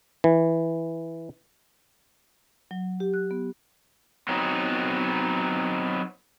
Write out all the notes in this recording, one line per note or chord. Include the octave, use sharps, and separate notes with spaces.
E3
F#3
G4
F#6
B3
F#3 B3 C4 D#4